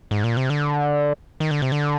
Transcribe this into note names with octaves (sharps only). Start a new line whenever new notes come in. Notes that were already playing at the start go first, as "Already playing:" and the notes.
G#2
A#2
C3
D3
D#3
D3
C3
D3